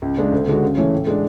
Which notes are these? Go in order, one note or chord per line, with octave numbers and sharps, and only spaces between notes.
C#2
C#3 G#3 D4
D2
D3 G#3 D4 F#4
C#3
E3 A3 C#4
A2
G#3 D4